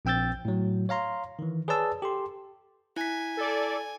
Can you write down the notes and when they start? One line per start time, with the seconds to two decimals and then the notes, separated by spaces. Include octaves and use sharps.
0.05 A#1 C4 G5 E6 G6 A6
0.45 A2 F#3
0.89 C#5 F5 A#5 C6
1.39 D#3 E3
1.68 G#4 B4 C#5 D5 A5 E6
2.02 G4 A4 C6
2.96 E4 G#5 B6
3.37 A4 D5